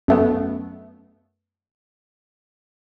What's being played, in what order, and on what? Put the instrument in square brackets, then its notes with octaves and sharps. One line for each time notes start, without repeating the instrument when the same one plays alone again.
[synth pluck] F#2 A3 B3